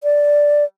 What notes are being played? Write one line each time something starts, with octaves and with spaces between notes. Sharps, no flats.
D5